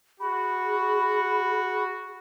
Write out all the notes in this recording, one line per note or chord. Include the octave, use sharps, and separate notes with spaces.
F#4 G#4 B5